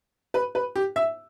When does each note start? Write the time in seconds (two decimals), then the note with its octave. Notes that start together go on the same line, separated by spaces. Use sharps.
0.34 B4
0.55 B4
0.76 G4
0.96 E5